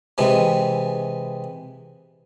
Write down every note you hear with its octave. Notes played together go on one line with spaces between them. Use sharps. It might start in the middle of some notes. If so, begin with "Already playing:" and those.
C3 E3 G#3